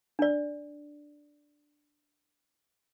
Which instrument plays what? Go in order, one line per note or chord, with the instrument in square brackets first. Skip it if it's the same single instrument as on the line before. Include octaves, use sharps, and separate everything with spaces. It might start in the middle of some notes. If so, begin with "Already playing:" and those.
[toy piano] D4 D5